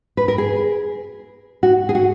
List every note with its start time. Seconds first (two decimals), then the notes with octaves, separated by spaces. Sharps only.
0.17 B4
0.28 A#4
0.38 G#4
1.63 F#4
1.89 G#4
1.95 F#4